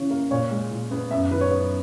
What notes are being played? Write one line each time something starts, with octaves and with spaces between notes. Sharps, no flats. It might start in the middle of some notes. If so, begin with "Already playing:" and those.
Already playing: C#3 E3 C#4
A#3
A#2 C#5
G#3
A#2
B3
F#2 E5
D#3 B4
C#5
B3